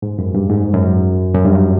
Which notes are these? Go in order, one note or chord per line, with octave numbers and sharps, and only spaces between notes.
G#2
F#2
G2
G#2
F#2
F#2
G2